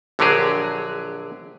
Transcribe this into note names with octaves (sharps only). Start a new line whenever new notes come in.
A#1 D3 F#3 G4 G#4